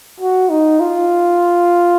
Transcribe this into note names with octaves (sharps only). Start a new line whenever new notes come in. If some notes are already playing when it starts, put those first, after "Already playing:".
F#4
D#4
F4